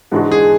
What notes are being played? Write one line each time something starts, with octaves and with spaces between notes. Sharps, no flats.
G#2 E3 G#3 D4 F#4
G#4